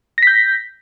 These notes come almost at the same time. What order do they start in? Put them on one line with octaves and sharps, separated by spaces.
A#6 B6 G6